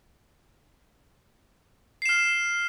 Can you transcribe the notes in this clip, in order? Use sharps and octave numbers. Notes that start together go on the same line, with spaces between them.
F6 C7 E7